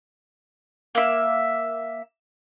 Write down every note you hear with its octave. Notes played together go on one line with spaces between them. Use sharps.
A#3 E5